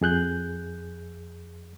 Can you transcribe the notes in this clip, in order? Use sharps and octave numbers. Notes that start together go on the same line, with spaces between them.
F2 G#4 F#6 G6